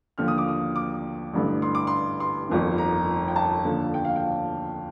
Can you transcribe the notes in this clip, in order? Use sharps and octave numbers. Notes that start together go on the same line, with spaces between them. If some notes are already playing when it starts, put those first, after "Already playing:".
D#2 D3 F3 F6
D#6
D6
D#6
D6
A1 G2 D3
C6
D6
C6
C6
G1 F2 D#3
A#5
G5
A5
D#2 D3 F3
G5
F5
G5